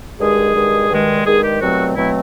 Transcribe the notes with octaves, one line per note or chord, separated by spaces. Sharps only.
G2 D#3 G#3 G#4
G2 D#3 G#3
G2 D#3 G#3
G2 D#3 G#3 G#4
G4
C2 B2 F#3 A3 C4 F#4
B2 F#3 A3 C4 E4